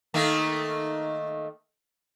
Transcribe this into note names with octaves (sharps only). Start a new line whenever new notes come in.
D#3 A3 A#3